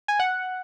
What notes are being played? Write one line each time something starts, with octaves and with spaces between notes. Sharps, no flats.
G#5
F#5